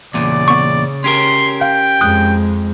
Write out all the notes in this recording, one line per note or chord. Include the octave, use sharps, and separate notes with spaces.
E2 A#2 C#3 D5
B3 C#6
C#4 G4 A#4 C6
F5 G5
F2 G#3 D#6 F#6